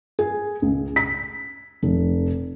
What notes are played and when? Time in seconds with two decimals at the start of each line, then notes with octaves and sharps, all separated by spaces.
0.19 G#4
0.62 C#2
0.96 B6
1.83 F1